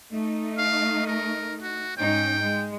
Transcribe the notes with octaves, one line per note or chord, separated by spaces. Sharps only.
A3 D#4
F5
A#4
F#4
G#2 C#4 D#4 G5
G#3